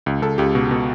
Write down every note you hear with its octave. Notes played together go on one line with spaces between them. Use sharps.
C#2
C#2 A4
C#2 G4
B2
B2